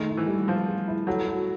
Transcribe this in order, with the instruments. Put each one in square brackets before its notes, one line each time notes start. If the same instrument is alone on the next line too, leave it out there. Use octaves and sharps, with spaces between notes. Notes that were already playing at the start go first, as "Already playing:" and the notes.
Already playing: [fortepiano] D#3 [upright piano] A3 G#4
[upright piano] E4
[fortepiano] E3
[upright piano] G3
[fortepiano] F3 [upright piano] B3
[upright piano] G#4
E4
[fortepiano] F#3 [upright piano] A4
[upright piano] F#4